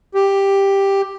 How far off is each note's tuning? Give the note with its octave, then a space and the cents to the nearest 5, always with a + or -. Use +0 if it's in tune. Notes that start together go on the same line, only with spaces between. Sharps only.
G4 +5